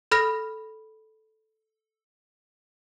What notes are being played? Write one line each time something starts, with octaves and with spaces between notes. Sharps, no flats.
A4 B5 F6 A#6